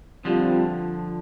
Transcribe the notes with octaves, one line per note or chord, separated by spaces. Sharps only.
D3 F3 G3 C4 F4